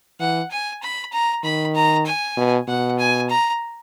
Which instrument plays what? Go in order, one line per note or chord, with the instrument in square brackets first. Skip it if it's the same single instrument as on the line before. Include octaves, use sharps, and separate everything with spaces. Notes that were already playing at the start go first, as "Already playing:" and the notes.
[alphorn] E3 [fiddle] F#5
[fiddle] G#5
B5
A#5
[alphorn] D#3 [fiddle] B5
[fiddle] A#5
G#5
[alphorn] B2
[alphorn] B2 [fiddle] F#5
[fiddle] G#5
A#5